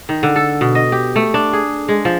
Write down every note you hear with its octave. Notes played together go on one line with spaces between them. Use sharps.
D#3
D3
A4
B2
D#5
G4
A3
D4
G#4
G#3
F3